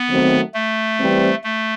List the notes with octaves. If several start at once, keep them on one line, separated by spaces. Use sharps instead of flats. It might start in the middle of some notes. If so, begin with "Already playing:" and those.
Already playing: B3
D#3 F#3 A3 C4
A3
E3 G3 C4
A3